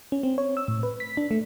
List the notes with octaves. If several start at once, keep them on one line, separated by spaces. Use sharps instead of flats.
C#4
C4
C#5
E6
A2
B4
B6
D4
A3